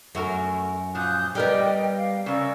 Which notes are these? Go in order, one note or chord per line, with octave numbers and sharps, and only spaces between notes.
F#2 A3 F#4 A#4
A#2 F3 D#6 F#6 G6
G3 B3 G4 A#4 D5 D#5 G5
F5
C#3 C#4 A#4 D5 E6